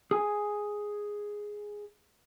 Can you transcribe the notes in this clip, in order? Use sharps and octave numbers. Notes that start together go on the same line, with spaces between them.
G#4 G#5